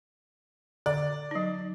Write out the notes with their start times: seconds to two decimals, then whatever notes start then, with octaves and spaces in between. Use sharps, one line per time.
0.86 D3 D5
1.31 F#3 D#4